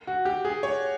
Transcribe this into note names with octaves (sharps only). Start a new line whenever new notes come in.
F#4
G4
G#4
C#5